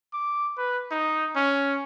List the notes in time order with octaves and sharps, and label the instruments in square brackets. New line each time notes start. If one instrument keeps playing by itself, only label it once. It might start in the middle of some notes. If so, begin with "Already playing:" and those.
[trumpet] D6
B4
D#4
C#4